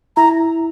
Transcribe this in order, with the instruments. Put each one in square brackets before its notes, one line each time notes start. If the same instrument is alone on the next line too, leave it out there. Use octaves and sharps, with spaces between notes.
[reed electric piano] E4 [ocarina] A#5